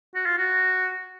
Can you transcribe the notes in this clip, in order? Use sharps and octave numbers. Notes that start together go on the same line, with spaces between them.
F#4
F4
F#4